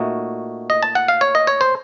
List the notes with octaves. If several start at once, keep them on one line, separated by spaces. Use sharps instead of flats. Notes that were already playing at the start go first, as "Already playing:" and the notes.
Already playing: A#2 A3 D#4 F#4
D#5
A5
F#5
F5
C#5
D#5
C#5
C5